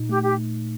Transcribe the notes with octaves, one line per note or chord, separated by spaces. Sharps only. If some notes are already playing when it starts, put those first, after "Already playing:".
Already playing: A#2 D#4
A3 G4
G4